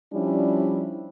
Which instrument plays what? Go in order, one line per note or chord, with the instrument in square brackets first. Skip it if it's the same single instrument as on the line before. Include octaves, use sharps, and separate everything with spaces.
[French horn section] F3 G3 C#4 D4 E4